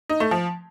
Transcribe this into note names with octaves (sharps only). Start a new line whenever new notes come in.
D#4
A3
F3